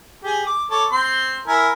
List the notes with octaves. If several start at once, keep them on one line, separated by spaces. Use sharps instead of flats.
G4 G#4
D6
A4 C#5 D6
C4 G5 C6
E4 A#4 G#5